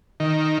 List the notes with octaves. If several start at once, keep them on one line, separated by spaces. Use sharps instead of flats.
D#3